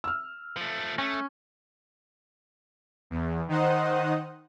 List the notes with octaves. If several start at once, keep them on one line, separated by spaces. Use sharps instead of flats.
E6 F6
F3 A3
A3 C#4
E2
D#3 D#4 C5 F#5 D#6